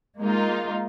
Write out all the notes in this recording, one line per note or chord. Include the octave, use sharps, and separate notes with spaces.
G#3 A#3 D#4 F4